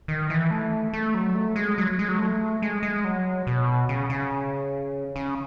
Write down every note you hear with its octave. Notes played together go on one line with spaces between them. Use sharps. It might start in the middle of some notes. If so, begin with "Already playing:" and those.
D#3
E3
A3
A3
F#3
A3
G#3
F#3
G#3
F#3
A3
G#3
G#3
F#3
B2
C#3
C#3
C#3